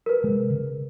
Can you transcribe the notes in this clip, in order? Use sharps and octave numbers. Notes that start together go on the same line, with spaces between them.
A#4 B4
C3 G#3
C#3